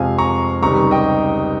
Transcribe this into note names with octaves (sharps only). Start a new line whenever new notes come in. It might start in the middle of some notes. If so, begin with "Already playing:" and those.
Already playing: F2 C3 F3 G#3 F5 G#5
A#5 C#6
C#2 C3 D#3 G3 A#5 C#6
D#5 G5